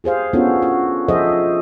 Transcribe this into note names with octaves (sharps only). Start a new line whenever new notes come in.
G4 G#4 C5 F5
B3 C#4 D4 F4 F#4 A4
F#4
F3 G#4 A4 C5 D#5 E5